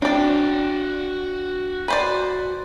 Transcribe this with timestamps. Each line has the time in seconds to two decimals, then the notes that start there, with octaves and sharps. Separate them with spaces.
0.02 C4 D4 F#4 D5 G5
1.88 B4 C5 D5